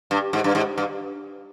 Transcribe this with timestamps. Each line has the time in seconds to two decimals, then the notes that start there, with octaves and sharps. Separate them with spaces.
0.11 G2
0.33 G#2
0.44 G2
0.55 G#2
0.78 G2